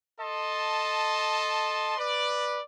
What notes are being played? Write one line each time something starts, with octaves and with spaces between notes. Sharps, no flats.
A4 D#5 A5 C6
B4 D5